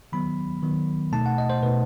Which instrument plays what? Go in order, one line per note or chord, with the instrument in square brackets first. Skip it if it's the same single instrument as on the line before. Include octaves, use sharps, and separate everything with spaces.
[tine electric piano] D#3 F#3 B3 B5
D#3 F#3 B3
B2 A3 D#4 A5
F#5
D#5
C5
B2 A3 D#4 B4